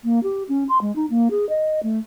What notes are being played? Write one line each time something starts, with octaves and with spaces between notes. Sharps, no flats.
A#3
G4
C#4
C6
G#3
D#4
A#3
G#4
D#5
A3